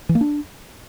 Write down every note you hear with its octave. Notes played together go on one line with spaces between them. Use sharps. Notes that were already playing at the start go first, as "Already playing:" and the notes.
E3
A#3
D4